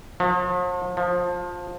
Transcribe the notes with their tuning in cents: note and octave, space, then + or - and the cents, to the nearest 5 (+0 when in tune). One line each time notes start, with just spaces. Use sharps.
F3 +45
F3 +20